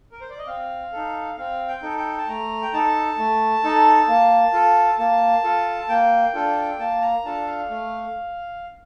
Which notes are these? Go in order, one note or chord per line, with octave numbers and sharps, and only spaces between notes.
A#4
C5
D5
D#5
C4 F5
D#4 A4
C4 F5
G5
D#4 A4
G5
A5
A3 A#5
G5
D#4 A4 A5
A3
D#4 A4
A#3
F4 A4
A#3 A5
F4 A4
A#3 G5
D4 F4 A4
A#3 A5
A#5
D4 F4 A4 A5
F5
A3